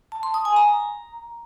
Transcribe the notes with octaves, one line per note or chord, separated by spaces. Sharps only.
A5
C6
D#6
G#5
A#5